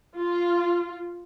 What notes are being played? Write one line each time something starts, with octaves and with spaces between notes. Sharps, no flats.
F4